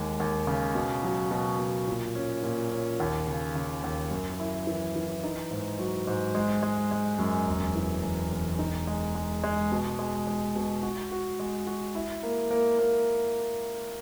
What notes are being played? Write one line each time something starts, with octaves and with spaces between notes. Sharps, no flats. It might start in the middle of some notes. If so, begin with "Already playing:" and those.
Already playing: D#2 G#3
D#2
C#3
B2
F#3
B2
B2
A#2
C#4
A#2
C#4
D#2
C#3
C#3
D#2
F#2
E4
E3
E3
D#4
G#2
F#3
G#2
G#3
G#3
G#3
F#2
E1
E3
E1
E1
D#4
G#3
G#3
G#3
B2
G#3
G#3
B2
F#4
F#4
G#3
F#4
E4
A#3
A#3
A#3